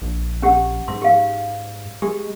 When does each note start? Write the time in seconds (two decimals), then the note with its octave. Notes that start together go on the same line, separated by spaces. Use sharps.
0.02 A#1
0.42 C#4 G4 F#5
0.88 G#2 C6
1.02 G4 F5
2.02 G#3 G4